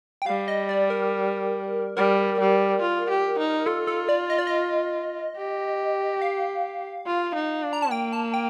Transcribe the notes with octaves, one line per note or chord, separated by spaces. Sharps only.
G5
G3 F5
D#5
D5
A#4
G3 A#4
G3
F4
G4
D#4
F4 A4
A4
D5
D#5
D5
D#5
G4
F5
F4
D#4
D4
A#5
A5
A#3 G5
A5
G5